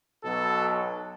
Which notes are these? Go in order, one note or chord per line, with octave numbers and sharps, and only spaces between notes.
B1 B2 F#3 A4